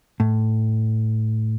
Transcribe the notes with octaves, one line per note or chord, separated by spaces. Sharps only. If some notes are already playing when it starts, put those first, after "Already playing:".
A2